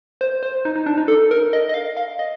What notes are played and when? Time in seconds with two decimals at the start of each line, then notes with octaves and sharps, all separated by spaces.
0.21 C5
0.43 C5
0.65 D#4
0.76 D#4
0.86 D4
0.97 D#4
1.08 A4
1.31 A#4
1.53 D#5
1.69 D#5
1.74 F5
1.97 F5
2.19 D#5